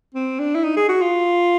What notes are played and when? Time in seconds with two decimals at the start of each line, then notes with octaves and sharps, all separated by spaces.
0.15 C4
0.40 D4
0.55 E4
0.64 D#4
0.77 G#4
0.89 F#4
1.02 F4